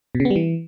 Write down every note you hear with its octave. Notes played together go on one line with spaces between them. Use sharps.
B2
C#3
B3
G3
E3